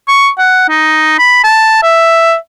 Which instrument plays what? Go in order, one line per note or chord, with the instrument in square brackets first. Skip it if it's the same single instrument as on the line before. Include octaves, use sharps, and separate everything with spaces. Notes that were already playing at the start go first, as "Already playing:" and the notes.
[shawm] C#6
F#5
D#4
B5
A5
E5